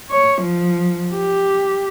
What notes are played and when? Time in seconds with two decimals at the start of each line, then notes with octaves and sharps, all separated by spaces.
0.11 C#5
0.42 F3
1.15 G4